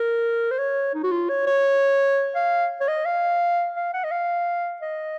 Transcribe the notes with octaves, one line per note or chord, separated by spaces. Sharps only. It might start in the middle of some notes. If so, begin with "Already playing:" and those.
Already playing: A#4
C5
C#5
D#4
F#4
F4
C#5
C#5
F5
C#5
D#5
F5
F5
F#5
D#5
F5
D#5